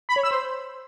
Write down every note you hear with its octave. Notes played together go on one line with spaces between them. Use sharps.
B5
C#5
E6
C5